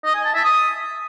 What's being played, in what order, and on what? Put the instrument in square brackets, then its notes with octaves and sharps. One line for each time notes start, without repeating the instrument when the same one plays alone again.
[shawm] D#5
G#5
A5
E5
D#6